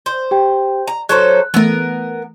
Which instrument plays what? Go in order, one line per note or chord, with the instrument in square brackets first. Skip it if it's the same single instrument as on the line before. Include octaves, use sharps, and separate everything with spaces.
[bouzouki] C5
[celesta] G4 G5
[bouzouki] A#5
[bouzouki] F#3 A4 C5 [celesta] F#6
[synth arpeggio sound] E3 A3 [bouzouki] B3 A#4